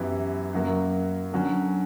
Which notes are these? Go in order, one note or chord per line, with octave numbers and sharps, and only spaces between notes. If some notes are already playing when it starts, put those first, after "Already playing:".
Already playing: F#2 E3 B3 E4 G4
F#2 C#3 F#3 A#3
D3 F#3 C#4